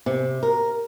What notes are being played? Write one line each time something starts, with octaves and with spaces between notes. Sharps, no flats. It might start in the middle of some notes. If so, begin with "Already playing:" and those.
C3
A#4